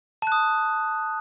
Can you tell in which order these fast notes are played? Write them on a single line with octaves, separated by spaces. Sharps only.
A5 F#6 D#6